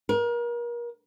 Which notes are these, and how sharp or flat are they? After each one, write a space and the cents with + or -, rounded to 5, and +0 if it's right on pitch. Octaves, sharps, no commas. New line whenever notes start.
A#4 +35